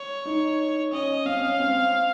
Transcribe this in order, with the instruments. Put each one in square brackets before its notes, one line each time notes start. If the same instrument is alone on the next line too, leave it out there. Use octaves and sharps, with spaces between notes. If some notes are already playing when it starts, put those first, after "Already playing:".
Already playing: [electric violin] C#5
[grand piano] D#4
[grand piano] C#4 [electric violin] D#5
[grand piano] C4 [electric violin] F5
[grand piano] C#4
C4